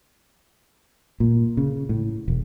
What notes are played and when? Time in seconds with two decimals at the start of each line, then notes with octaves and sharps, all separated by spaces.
1.20 A#2
1.57 C#3
1.89 A2
2.28 E1